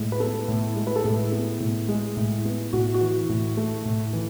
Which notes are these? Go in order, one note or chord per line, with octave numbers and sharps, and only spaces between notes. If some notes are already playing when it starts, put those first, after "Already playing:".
Already playing: A2 G#3
B4
B3 A4
A2
G#3
B4
A4
A2 G#4
B3
A2
G#3
A2
B3
A2 F#4
F#4
E3
A2
A3
A2
E3